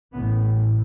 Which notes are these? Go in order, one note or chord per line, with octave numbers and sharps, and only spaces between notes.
A1 A2 B3